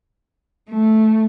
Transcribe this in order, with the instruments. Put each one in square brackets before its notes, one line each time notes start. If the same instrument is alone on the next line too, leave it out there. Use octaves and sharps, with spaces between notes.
[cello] A3